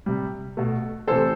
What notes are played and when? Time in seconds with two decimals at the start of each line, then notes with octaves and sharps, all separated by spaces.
0.06 C3 G3
0.57 B2 A3
1.07 C3 E3 A3 A4 C5